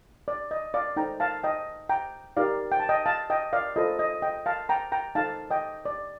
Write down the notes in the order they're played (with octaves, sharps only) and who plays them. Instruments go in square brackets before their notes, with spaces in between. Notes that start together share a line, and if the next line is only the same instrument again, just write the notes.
[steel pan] D5
D#5
D5 F5
D#4 A4 C5 G5 A#5
F5 A5
D#5 G5
G5 A#5
D#4 G4 A#4 D5 F5
G5
A5
D#5 G5
F5 A5
D#5 G5
D5 F5
F4 A4 C5 D#5
D#5
D#5 G5
F5 A5
G5 A#5
G5 A#5
D#4 A4 C5 F5 A5
D#5 G5
D5